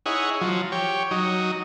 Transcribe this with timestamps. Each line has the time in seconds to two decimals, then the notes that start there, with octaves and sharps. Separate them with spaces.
0.06 D#4 E4 G#4 C#5 F#5
0.41 F3 F#3
0.72 G4 C#5
1.11 F#3 D#4